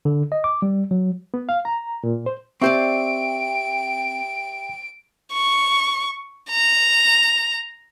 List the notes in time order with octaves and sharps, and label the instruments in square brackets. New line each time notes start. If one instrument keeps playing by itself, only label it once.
[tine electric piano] D3
D#5
D6
G3
F#3
[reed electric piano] B3
F5
A#5
A#2
C5
[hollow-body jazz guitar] C4 C5 D5 [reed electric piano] G4 E5 C#6 [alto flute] G5 [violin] D7
[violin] C#6
A#5